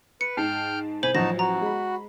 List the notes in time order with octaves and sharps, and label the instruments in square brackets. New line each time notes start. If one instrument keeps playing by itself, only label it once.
[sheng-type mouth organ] B4 [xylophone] C#7
[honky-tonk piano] G#2 A5 C7 [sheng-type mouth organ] G5 F6
[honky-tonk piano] C2 [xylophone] C5 F#7 [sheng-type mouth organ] G#5 B5
[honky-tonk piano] A1 F3 F#3 [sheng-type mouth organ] D#4 F#4 A5 [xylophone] A#6
[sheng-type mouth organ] F#4 [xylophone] A#5
[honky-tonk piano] G#3 B5